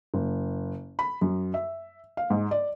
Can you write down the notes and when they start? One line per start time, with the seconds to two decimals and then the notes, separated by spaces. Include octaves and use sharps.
0.14 F#1
0.99 B5
1.21 F#2
1.54 E5
2.17 F5
2.30 G#2
2.51 D5